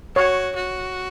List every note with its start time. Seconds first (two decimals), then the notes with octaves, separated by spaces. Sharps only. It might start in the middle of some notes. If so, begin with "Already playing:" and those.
0.16 F#4 C#5
0.56 F#4